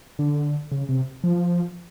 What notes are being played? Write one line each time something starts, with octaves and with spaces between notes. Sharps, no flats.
D3
C#3
C3
F3